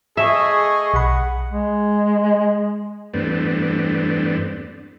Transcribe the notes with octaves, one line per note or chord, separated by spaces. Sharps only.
A3 G#4 D#5 E5 C#6
B1 F#5 B5
G#3
E2 G2 A3 B3 C4 D4